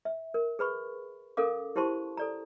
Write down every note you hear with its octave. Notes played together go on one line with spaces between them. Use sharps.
E5
A#4
G#4 B4 B5 C#6
C#4 A4 A#4 F5 D6
E4 G4 C5 A5 C6 C#6
A4 D5 A#5